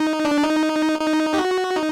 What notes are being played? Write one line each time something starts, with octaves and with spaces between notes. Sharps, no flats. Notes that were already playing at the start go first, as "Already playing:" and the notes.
Already playing: D#4
D4
D#4
D#4
G4
F#4
D#4